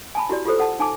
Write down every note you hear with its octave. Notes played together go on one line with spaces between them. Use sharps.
G#5 A5 B5
E4 F#4 G4 D5
F4 G4 A4 C5
A4 F#5 A5
D#4 G#5 A5 D6